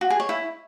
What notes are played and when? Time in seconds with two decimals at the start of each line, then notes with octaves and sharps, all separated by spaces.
0.01 F#4
0.10 G#4
0.20 C#5
0.29 E4